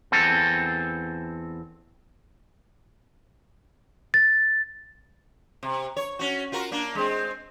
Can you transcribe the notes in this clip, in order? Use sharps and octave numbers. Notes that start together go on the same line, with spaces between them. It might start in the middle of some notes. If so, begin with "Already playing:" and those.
E2 C4 A4
A6
C3
C#5
C#4 F#4
F4 F#4 A#4
A#3 D4
G#3 C4